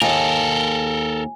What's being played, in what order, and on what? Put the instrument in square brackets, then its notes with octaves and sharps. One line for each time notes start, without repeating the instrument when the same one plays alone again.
[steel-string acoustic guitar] D#2 [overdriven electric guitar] A4 A#4 [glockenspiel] G#5